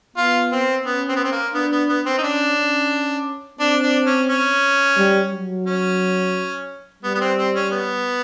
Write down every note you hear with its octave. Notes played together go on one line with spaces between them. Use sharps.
B3 F4
C4
B3 C#4
C4
B3
C4
A#3
B3 D4
B3
B3
C4
D#4
C#4 D4
C#4
C4 D4
D4
C#4
C#4
G3
F#3
C#4
G3 B3
B3
C4
C4
C#4
B3